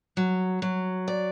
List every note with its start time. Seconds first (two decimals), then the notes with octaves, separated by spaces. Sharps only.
0.17 F#3
0.62 F#3
1.08 D5